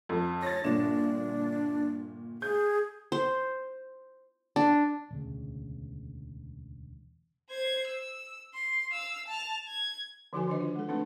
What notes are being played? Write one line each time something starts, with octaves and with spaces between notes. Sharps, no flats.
F2
C#5 A6 A#6
G1 A#2 D4 E7
G#4 G6
C5
D4
E1 D2 C#3
C5 G#6
E6
C6
F5 E6
A5 F7
G#6
D3 F3 D#4 F#4 A4 G#5
D3 D#3 D4 B4 D#5
F4
G#3 A4
A3 C4 D4 D#4 A4 B4